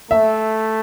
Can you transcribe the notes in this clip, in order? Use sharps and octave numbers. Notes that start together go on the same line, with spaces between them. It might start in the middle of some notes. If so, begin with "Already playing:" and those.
A3 E5